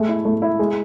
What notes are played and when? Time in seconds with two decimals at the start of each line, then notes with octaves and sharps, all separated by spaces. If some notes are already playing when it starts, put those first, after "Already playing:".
Already playing: G#3 A3
0.09 E4
0.25 A3
0.42 E4
0.59 G#3